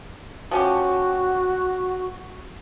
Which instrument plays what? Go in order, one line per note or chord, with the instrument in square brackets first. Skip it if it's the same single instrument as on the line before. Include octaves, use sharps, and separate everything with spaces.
[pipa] F3 C#4 G4 [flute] F#4